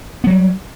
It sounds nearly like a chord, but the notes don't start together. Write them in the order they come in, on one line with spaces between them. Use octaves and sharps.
B3 F#3 G3